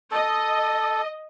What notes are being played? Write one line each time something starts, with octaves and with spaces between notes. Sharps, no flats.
A4 D#5